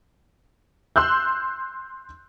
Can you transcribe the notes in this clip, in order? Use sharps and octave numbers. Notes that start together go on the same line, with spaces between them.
C6 E6 F#6 G6